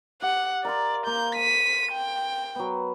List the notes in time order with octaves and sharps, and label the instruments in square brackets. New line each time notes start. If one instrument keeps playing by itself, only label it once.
[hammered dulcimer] G4 [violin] F#5
[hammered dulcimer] A#4 F5 C6 [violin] D5
[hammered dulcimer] A#3 [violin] G6
[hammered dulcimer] A5 [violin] B6 D#7
[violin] G5
[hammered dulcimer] F#3 B3